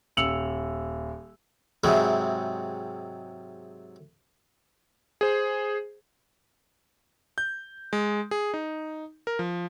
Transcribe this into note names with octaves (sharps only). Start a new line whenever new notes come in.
D#1 E6 C#7 F7 F#7
G#2 C3 F#3 G#3 C4 E4
G#4 C5
G6
G#3
G#4
D#4
A#4
F3